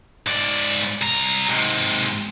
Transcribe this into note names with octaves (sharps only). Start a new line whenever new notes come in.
G#2 D5
C2 A#5
G#2 C3